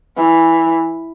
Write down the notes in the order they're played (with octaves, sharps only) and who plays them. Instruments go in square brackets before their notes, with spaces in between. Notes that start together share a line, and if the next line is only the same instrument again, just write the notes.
[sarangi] E3